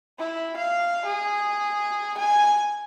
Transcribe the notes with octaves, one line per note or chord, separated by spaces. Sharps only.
E4
F5
G#4
G#5